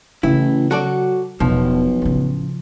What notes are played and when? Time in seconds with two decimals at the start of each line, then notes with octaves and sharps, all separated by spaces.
0.23 A1 C#3 E4
0.71 F#3 F#4 A4 D5
1.40 E1 B1 B2 F3
2.02 A1 C#3